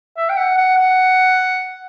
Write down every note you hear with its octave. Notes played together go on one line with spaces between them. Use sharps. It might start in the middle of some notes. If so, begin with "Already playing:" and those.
E5
G5
F#5
F#5
F#5